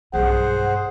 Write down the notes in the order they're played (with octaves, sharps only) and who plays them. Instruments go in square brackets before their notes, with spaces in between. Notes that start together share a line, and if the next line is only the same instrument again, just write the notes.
[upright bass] B1 G2 [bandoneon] G#4 C5 [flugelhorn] F#5